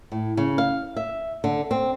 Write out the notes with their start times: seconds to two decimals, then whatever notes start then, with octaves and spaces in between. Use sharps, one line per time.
0.12 A2
0.37 C#3
0.58 F5
0.96 E5
1.44 D3
1.71 C4